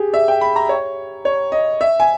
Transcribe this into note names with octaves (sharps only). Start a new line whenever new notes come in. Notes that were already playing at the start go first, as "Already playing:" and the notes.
Already playing: G4 G#4
E5
G5
B5
A#5
C#5
C#5
D#5
E5
G#5